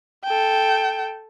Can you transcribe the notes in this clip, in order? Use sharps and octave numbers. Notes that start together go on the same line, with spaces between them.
A4 G5